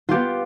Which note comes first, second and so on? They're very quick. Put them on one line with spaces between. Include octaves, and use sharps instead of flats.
F4 G4 B3